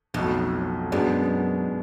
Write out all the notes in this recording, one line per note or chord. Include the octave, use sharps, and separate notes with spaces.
B1 F2 A2 F#3
F#2 B2 G#3 B3 D4